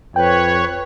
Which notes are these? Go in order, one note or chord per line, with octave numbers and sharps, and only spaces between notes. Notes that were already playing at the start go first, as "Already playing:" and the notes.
F2 B4 C#5 G5